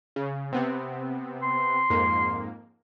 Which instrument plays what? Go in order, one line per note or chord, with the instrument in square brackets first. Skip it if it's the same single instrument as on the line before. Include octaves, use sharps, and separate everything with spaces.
[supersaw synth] C#3
C3 B3 C4
[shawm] C6
[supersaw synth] F2 G#2 A#3